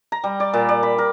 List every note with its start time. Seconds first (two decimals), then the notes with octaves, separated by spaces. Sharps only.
0.12 A#5
0.24 G3
0.40 D5
0.53 A#2
0.69 D5
0.83 B5
0.98 A#4